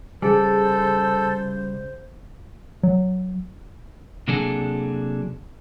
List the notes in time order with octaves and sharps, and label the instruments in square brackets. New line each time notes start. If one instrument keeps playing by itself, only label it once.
[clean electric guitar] C#3 G3 [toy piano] G#4 G#5 [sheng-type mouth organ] A4 [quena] C5
[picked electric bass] F#3
[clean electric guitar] C3 F#3 A#3 D4 G#4 A4